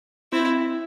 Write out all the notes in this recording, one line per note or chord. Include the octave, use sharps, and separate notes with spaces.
C4 E4